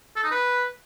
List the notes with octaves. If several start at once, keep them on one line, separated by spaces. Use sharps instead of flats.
A4
D#4
B4